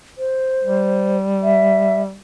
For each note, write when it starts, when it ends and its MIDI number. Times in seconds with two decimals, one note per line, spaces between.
0.18 1.17 72
0.64 2.17 55
1.43 2.02 76